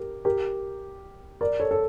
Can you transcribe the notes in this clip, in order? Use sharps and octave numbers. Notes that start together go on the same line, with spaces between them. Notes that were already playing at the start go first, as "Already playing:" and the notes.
Already playing: G4 A#4
G4 A#4
A#4 D5
A4 C#5
A4